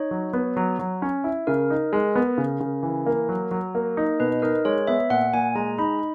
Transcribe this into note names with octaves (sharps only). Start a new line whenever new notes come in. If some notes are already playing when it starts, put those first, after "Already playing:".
Already playing: D#4 C#5
F#3
B3
F#3
F#3
C#4
E4
C#3 A#4
D#4
G#3
B3
C#3
C#3
E3
A#3
F#3
F#3
A#3
D#4
B2 B4
D#4 A#4
G#3 C#5
B3 E5
A#2 F#5
A#2 G#5
G#3 A#5
D#4 B5